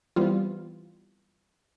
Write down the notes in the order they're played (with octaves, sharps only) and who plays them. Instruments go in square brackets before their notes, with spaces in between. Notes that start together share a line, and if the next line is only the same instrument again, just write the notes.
[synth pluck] E3 G3 B3 C4 F4